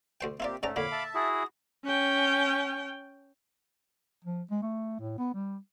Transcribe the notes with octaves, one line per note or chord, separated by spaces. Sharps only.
D2 C5 G5
A#3 C4 E4 F4 G4 D5
G#2 A3 C#4 D5 A#5
F2 A#2 D3 C#5 F5 B5 D6
E5 A5
E4 F#4 G#4 D#6
C#4 G5
F3
G#3
A3
A2
B3
G3